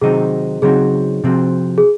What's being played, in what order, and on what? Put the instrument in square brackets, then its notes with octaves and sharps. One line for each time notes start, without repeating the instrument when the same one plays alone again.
[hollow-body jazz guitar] C3 D#3 F#3 C4 D#4 [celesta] G#4
[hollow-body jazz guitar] C#3 F#3 C4 D#4 F#4 [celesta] G#4
[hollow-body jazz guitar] C3 F3 C4 F#4
[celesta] G#4